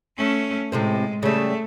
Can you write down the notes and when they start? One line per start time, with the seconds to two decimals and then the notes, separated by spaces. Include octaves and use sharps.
0.17 A3 C#4
0.72 A2 C3 G#3 C4
1.23 C#3 G3 A3